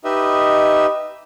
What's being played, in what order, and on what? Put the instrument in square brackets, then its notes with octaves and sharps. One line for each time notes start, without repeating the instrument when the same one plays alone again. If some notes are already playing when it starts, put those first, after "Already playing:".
[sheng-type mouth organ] D#4 G4 B4 D#5 E5